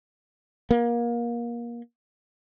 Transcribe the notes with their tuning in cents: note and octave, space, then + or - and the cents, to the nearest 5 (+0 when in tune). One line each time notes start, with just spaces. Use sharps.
A#3 +25